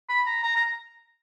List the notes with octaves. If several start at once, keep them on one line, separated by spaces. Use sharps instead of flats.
B5
A#5
A#5
A#5